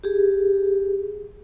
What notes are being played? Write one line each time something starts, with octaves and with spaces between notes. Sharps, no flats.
G4 G#4